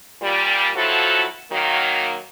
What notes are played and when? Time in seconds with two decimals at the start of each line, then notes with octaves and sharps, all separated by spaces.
0.22 A#2 G3
0.75 F2 F3 F#3 E4 F#4 A4
1.51 D#3 F#3 A#3